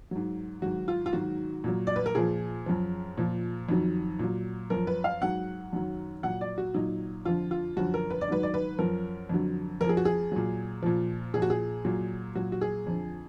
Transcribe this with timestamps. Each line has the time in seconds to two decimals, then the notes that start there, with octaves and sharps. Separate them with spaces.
0.11 G#2 F#3
0.62 G#2 D#3 F#3 F#4
0.88 F4
1.06 F4
1.13 G#2 D#3 F#3 F#4
1.64 A#2 F#3
1.87 D5
1.96 B4
2.06 A#4
2.15 A#2 F3 G#4
2.66 F#2 F3
3.17 A#2 F3
3.69 F2 D#3 F#3
4.19 A#2 F#3
4.70 F#2 F3 A#4
4.87 B4
5.04 F5
5.21 G#2 F#3 F#5
5.73 F#2 D#3 F#3
6.23 A#2 F#3 F#5
6.41 D5
6.58 F#4
6.74 A#2 F#3 D#4
7.25 F2 D3 F3 F4
7.51 F4
7.77 F#2 D3 F3 F#4
7.94 A#4
8.10 B4
8.21 D5
8.27 G#2 D#3 F#3 B4
8.43 D5
8.54 B4
8.79 F#2 F3 A#4
9.29 F2 D3 F#3
9.81 F2 A#4
9.84 F3
9.89 G#4
9.97 F#4
10.05 G#4
10.32 A#2 F#3
10.83 A#2 F3
11.34 A#2 F3 G#4
11.42 F#4
11.50 G#4
11.85 A#2 F#3
12.35 A#2 F#3 F#4
12.52 F#4
12.61 G#4
12.87 F2 D3 F3